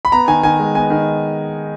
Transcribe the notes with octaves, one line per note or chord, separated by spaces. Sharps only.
B5
B3 A#5
D#3 G#5
D#3 G#5
G#3
B3 G#5
D#3